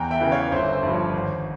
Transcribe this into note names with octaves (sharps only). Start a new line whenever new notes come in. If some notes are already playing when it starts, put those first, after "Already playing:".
Already playing: E2 G5 A#5
E5 G5
C#3 E3
C#5 F5
G1 C5 E5
C5 E5
G2 F3
C#5
G#1 C5